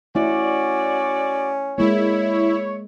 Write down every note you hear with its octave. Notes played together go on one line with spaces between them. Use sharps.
A3 C#4 E4 F#4 D5
G#3 A#3 E4 C#5